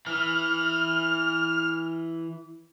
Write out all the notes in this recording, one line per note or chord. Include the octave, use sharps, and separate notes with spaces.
E3 F6